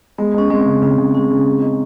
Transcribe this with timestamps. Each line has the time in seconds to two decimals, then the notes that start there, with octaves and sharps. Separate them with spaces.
0.18 G#3 B3
0.34 G#3 C#4
0.50 G#3 C4
0.66 C#3
0.82 C#3 C4
0.98 C#3
1.15 G#3 C#4
1.31 C#3
1.46 G#3
1.62 D#4